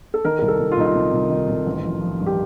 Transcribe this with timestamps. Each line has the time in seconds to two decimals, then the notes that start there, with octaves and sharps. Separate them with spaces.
0.14 A4
0.25 D#3 A#4
0.39 C2 A#4
0.48 A4
0.59 C2
0.72 F4
0.77 C2 D#4
0.85 F4
0.95 C3
1.12 C2
1.30 D#3
1.49 C2
1.66 A1
1.83 F3
2.01 F3
2.20 G2
2.26 G4